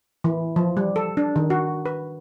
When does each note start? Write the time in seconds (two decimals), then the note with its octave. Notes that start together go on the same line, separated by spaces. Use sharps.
0.24 E3
0.56 F3
0.77 G3
0.96 A4
1.17 D4
1.36 D#3
1.50 F#4
1.86 B4